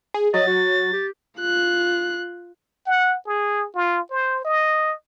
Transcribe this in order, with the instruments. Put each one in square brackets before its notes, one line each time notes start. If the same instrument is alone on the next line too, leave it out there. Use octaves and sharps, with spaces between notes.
[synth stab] G#4
[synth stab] F#3 [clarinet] D#5 [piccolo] A6
[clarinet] F#4
G4
[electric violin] F4 F#6
[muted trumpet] F#5
G#4
F4
C5
D#5